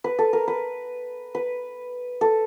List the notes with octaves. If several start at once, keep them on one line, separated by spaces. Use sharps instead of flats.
B4
A4
A#4
B4
B4
A4